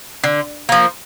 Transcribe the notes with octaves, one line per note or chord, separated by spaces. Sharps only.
D3
F3 A#3